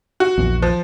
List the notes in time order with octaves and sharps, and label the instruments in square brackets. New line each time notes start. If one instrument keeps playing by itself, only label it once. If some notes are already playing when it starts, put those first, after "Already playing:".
[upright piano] F#4
[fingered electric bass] A#1 E2
[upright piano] F3